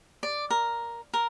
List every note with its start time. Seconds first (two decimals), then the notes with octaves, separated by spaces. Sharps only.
0.23 D5
0.50 A#4
1.14 A#4